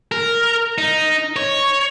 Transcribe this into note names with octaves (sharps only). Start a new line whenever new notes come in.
A#4
D#4
C#5